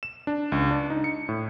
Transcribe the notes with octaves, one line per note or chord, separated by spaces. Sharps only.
E7
D4
C#2
D4
D#4
C#7
A2